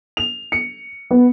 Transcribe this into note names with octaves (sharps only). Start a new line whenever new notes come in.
F7
C#7
B3